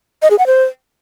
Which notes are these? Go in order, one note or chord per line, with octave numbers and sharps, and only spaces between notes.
D#5
G#4
F#5
C5